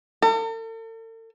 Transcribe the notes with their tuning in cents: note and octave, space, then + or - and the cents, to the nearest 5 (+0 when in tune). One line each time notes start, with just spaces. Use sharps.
A4 +45